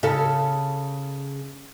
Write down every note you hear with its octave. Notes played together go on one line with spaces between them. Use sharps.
C#3 A4